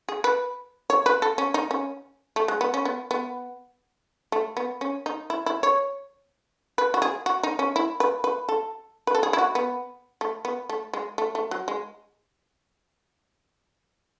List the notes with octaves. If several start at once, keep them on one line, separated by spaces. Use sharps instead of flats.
G#4
B4
C#5
B4
A4
C#4
D#4
C#4
A3
G#3
B3
C#4
B3
B3
A3
B3
C#4
D#4
E4
E4
C#5
B4
F#4
G#4
F#4
D#4
C#4
E4
B4
B4
A4
B4
A4
G#4
E4
F#4
B3
A3
B3
A3
G#3
A3
A3
F#3
G#3